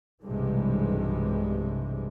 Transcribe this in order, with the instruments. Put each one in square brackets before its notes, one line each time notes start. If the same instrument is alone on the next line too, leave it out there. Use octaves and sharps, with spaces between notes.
[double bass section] B1 G2 C3 E3 G3 G#3